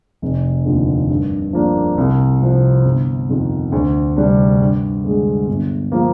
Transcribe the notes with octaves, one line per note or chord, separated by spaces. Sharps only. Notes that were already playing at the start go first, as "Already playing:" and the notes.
F1
D#2 D3 F3 A#3
G2
F3 A#3 D4
C2
C3 F3 C4
G1
F2 D#3
D2
C3 G3 D4
G2
D3 G#3
G1
F3 A#3